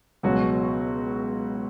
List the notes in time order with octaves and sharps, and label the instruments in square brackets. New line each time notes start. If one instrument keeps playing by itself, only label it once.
[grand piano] C#2 B2 F#3 C#4 F#4